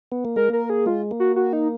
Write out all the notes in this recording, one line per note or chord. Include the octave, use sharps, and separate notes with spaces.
B3
A#3
G#3 A#4
A#3 A#4
G#4
G#3 F4
A#3
F#4
F#4
D#4